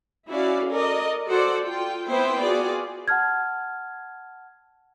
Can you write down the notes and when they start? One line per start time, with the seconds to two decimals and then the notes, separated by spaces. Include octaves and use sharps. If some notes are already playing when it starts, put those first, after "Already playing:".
0.28 C#4 E4 F#4 D5 F5
0.69 A4 A#4 D5 D#5
1.28 F#4 A4 C5 D5 F#5
1.63 F4 G5
2.08 B3 C4 E4 B4 C5 G5
2.41 F4 F#4 G#4 D5
3.08 F#5 A5 F6 G#6